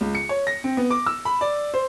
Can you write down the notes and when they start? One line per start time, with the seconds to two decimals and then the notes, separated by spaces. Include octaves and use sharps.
0.01 C#2
0.15 C#7
0.29 C#5
0.47 A#6
0.64 C4
0.77 B3
0.91 D6
1.06 E6
1.25 B5
1.41 D5
1.74 C5